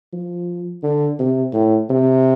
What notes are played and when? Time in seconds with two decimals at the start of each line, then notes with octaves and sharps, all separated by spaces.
0.13 F3
0.83 D3
1.19 C3
1.53 A2
1.90 C3